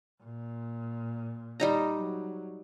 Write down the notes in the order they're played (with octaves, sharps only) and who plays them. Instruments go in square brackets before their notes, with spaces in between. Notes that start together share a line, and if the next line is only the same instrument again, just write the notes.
[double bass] A#2
[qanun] G3 D#4 A#5
[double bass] F#3